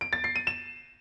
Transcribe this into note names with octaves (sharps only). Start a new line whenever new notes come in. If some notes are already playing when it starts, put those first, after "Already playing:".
D7
A6
C7
D#7
E7